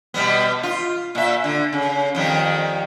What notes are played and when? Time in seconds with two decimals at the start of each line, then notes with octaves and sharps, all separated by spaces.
0.14 B2 G3 B3
0.63 F4
1.15 A#2 E5
1.44 D3
1.73 C#3
2.15 F2 D#3 G3